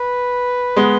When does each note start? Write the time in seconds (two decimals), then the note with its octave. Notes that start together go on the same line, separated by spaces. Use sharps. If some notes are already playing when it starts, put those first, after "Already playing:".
Already playing: B4
0.77 G#3 B3